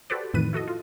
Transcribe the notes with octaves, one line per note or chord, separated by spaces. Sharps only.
F#4 G4 A4 B4 C5 D5
F2 A2 D#3 E3 B4 D#7
E4 F#4 A4 D#5
F4